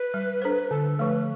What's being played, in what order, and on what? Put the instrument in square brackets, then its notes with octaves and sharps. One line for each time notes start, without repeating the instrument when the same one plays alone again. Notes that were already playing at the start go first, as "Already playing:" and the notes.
Already playing: [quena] B4
[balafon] G3
D4 A4 C5
[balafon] D3 [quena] A4
[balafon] F3 A3 [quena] B4